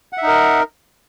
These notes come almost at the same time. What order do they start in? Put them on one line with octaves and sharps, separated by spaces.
F#5 E5 D#4 A#4